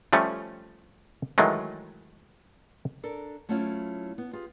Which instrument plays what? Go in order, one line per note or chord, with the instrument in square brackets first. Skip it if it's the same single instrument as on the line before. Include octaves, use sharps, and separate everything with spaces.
[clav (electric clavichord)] F3 G3 A3 C#4
D#3 E3 F#3 G#3 A3
[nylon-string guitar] D4 A4 A#4
F#3 A3 C4 C#4 E4 F4
B3
F4 G4 G#4